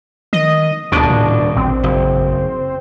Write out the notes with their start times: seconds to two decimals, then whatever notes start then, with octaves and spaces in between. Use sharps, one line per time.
0.33 D#3 D#5
0.92 D#1 D2 B2 D4
1.10 A2
1.56 A1 C4
1.83 F#1